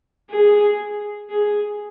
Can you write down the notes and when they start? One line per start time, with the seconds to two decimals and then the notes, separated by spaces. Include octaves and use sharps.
0.30 G#4
1.30 G#4